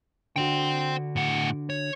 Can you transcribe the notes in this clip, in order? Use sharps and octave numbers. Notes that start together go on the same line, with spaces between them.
D3 D4 F#4 C5 G5
A2 F#5
C#5